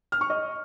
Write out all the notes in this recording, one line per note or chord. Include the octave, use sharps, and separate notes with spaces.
F6
C#6
D#5